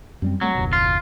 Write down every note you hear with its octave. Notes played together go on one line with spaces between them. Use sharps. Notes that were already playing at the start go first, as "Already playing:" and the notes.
F#2 G3 C4
F#3 G3 A3 C4
F#1 D#2 B2
F4